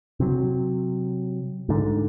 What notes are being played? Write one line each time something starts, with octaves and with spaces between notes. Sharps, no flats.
C3 F#3
G#2 D3